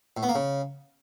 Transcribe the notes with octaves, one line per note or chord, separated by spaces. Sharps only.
A2
B3
A#3
C#3